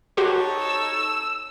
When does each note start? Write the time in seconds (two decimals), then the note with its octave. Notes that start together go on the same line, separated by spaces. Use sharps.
0.17 D#4 F#4 G4 A4 C5 C#5
0.62 E6